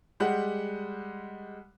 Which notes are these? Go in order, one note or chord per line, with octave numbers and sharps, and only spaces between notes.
G3 G#3 G4 F#5 F#6